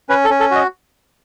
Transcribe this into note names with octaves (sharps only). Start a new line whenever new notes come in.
C#4 B4
A4
C#4
A4
F#4 D#5